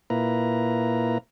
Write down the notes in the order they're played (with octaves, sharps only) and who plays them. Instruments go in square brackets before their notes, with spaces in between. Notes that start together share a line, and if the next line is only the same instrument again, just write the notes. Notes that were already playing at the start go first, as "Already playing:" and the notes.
[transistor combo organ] A#2 A#3 E4 B4 A#5